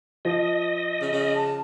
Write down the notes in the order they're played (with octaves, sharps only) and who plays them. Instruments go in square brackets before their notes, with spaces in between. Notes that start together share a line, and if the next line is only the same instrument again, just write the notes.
[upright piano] F3 [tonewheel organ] D#5
[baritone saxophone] C#3
C#3
[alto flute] A5